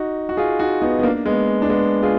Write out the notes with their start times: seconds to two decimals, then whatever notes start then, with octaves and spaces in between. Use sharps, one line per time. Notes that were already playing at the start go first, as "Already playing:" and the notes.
Already playing: D#4 F#4
0.29 F#4
0.37 F4 G#4
0.59 D#4 F#4
0.82 B3 D#4
0.99 B3
1.03 A#3 D4
1.26 G#3 B3
1.62 D4
1.70 G#3 B3
2.03 F4 G#4